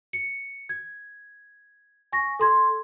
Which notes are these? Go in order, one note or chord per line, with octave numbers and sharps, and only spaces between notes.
C#7
G#6
G#5 C#6 A#6
A4 C6 G#6